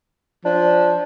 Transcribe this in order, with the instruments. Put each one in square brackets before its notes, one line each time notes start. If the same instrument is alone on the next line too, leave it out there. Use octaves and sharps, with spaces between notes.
[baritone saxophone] F3 [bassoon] D4